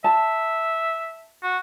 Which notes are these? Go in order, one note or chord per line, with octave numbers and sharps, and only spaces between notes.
E5 A5
F#4